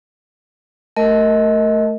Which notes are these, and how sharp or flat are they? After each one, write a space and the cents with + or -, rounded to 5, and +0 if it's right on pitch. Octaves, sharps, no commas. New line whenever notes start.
A3 +0 A#4 -15 D#5 +25